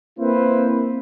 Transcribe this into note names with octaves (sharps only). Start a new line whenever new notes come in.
A#3 C4 E4 B4 C5